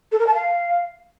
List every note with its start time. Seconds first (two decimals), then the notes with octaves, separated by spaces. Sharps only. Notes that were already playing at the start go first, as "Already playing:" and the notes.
0.12 A4
0.19 A#4
0.27 A5
0.34 F5